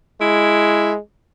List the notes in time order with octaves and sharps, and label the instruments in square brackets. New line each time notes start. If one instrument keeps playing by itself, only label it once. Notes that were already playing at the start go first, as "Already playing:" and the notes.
[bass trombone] G#3 [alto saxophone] E4